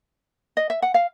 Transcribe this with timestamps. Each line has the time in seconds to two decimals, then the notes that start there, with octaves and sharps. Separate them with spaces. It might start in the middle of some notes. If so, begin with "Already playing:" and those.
0.57 D#5
0.70 E5
0.82 F#5
0.94 F5